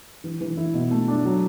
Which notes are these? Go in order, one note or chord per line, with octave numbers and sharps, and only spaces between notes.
E3
E3
E4
B2
A3
D4
F#3